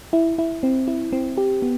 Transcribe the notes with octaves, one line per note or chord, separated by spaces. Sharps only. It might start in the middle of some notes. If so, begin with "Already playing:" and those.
E4
E4
C4
E4
C4
G4
B3